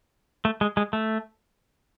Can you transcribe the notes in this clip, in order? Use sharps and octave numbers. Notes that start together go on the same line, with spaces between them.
A3
G#3
G#3
A3